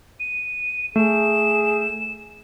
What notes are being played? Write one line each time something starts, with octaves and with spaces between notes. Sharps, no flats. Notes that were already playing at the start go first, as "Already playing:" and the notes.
D#7
A3 G#4 E7